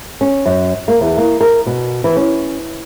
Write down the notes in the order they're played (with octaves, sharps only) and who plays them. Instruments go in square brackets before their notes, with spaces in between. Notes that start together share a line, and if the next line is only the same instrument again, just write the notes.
[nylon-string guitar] C#4
F#2
A#3
E2
A#3
A#4
B2
E3
C#4